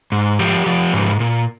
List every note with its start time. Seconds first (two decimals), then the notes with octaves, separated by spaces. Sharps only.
0.12 G#2
0.39 F3 G4
0.66 F3
0.93 G#2
1.20 A#2